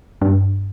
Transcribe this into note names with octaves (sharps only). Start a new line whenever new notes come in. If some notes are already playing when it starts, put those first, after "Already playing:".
G2